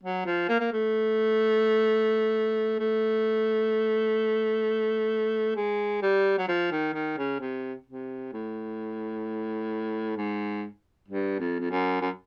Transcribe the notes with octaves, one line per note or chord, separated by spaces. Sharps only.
F#3
F3
A#3
A#3
A3
A3
G#3
G3
F#3
F3
D#3
D#3
C#3
C3
C3
A2
G#2
G2
F2
F2
F#2
F#2